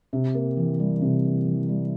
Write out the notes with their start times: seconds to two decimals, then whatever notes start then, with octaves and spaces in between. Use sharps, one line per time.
0.13 C3
0.35 A#3
0.57 E3
0.80 G3
1.02 C3
1.25 A#3
1.47 E3
1.69 G3